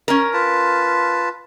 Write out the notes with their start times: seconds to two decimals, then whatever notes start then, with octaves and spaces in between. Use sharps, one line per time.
0.08 C#4 A#4
0.33 F4 B4 A5